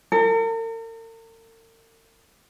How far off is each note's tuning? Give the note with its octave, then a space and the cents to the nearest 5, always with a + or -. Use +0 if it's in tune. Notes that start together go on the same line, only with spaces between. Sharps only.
A#4 -45